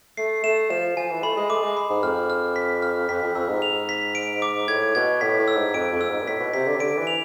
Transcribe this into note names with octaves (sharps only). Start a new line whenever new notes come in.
A3 C7
A3 E7
F3 E7
F3 G#5
E3
A3 B5
G#3
A3 D6
G#3
B5
G#2
F2 F6
F6
B6
F6
F2 B6
F2
F2 E6
G#2
F7
B6
D7
D6
A2 G#6
B2 G#6
A2 B6
A2
E6
G#2
F2 D7
F2
E6
G#2
B2
A2 B6
B2
C3 B6
D3
C3
D3 D7
E3
F7